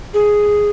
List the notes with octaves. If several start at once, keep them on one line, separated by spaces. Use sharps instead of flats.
G#4